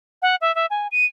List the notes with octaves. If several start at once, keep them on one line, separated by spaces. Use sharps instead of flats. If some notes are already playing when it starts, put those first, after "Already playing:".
F#5
E5
E5
G#5
D#7